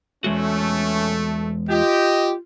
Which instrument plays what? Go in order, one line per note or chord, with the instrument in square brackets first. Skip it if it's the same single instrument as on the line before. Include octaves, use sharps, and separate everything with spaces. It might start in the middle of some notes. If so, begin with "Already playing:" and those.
[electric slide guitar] E2 G#3 F#4 [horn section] A3 [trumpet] C#4
[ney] F4 [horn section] G4 [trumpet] D#5